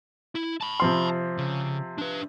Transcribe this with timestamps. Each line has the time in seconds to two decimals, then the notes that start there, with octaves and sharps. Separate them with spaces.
0.35 E4
0.61 A5 B5
0.80 C3 F3 C6
1.38 C#3
1.98 D4 B4